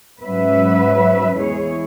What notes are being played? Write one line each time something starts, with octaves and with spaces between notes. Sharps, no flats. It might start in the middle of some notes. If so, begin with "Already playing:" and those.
G#2 F#3 C#4 B4 E5
E2 E3 G#3 E4 G#4 C#5